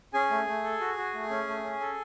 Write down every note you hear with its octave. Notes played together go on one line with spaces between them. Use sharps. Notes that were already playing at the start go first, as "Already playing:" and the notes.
C#4 G#4 G#5
A3
A3
A4
F#4
F#4
A3
C#4
A3
C#4
A4